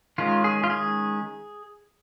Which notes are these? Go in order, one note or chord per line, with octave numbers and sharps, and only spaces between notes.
D#3 G#3 C#4 F4
G#4
F4
G#4